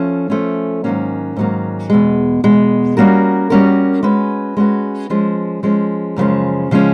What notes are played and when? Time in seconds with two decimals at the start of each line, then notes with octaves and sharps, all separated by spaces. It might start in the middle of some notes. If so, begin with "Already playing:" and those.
Already playing: F3 A3 C#4
0.30 F3 A3 C#4
0.84 G#2 D#3 F#3 A#3 C#4
1.36 G#2 D#3 F#3 A#3 C#4
1.90 E2 B2 G#3
2.44 E2 B2 G#3
2.97 G3 A#3 C#4 F#4 A#4
3.50 G3 A#3 C#4 F#4 A#4
4.03 G#3 C#4 F#4 B4
4.57 G#3 C#4 F#4 B4
5.10 F3 G#3 C#4
5.63 F3 G#3 C#4
6.16 F#2 C#3 F3 G#3 C#4
6.71 C#3 F3 G#3 C#4